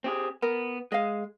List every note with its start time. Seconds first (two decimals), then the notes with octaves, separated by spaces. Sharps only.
0.04 C4 G4 G#4
0.42 B3 A#4
0.92 G#3 D#5 F5